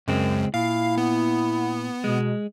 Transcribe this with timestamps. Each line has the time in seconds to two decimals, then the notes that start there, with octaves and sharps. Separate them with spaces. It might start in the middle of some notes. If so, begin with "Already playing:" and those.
0.08 C#2 F#2 G#3 C4
0.54 A#2 E4 F5
0.98 B3
2.04 B2 G#3